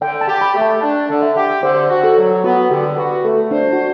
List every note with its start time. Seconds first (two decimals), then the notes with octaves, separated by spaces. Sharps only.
0.02 D3 G5
0.21 A5
0.28 G4
0.41 B5
0.55 A3
0.62 A5
0.82 D4
1.10 D3
1.23 E5
1.36 G4
1.63 D3 C5
1.90 F#4
2.04 A4
2.17 F#3
2.44 B3 F#4
2.71 D3 G4
2.98 F#4 B4
3.25 A3 A4
3.51 D4 C5
3.73 F#4